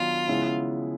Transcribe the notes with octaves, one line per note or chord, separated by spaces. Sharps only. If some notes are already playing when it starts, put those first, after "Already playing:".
Already playing: D#3 F#3 B3 D4 F4
C#3 F3 G#3 B3 E4